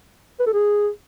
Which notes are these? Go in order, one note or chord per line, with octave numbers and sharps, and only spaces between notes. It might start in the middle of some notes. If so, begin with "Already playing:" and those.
B4
A4
G#4